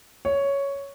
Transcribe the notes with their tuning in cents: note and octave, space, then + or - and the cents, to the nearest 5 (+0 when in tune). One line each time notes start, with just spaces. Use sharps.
C#5 +5